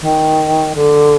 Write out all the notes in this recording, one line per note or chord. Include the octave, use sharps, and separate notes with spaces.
D#3
D3